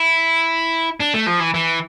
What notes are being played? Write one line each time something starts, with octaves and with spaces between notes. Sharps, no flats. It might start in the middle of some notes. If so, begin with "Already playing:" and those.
Already playing: E4
D4
A3
F3
E3
E3